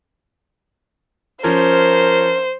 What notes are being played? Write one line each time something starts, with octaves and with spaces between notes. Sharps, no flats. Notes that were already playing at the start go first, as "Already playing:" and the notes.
F3 C#4 A#4 C5